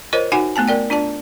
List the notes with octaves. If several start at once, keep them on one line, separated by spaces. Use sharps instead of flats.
F4 A#4 C5 C#5 D#5
D#4 F#4 F#5 G#5
A3 B3 G#5 A5
A#4 D5 G5
D4 F4 D5 A5